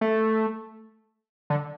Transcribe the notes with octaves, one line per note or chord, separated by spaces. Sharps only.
A3
D3